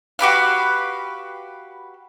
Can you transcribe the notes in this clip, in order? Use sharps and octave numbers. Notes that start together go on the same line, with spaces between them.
F#4 G4 B4 F5